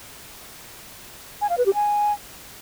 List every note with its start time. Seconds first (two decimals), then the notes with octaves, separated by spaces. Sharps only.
1.41 G#5
1.49 F5
1.58 B4
1.66 G4
1.74 G#5